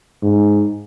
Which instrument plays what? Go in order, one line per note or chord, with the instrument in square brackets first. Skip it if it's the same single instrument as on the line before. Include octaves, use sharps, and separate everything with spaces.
[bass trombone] G#2